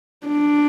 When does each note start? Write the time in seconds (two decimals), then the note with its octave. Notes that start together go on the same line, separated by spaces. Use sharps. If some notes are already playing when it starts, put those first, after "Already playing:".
0.27 D4